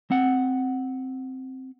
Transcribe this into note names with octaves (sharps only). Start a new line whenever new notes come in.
C4 F#5